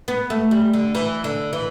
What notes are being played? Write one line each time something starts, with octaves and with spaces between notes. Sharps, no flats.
B3
A3
G3
D3
E3
D3
E3